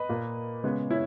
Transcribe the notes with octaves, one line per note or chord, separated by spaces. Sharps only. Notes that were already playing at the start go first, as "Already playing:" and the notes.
Already playing: B4 D#5
A#2 A#3
C#3 G#3 B3
C#4 E4